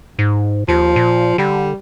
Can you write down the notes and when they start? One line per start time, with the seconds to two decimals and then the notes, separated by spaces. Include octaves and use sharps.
0.19 G#2
0.68 D#2 F3
0.96 A#2
1.38 D3 G3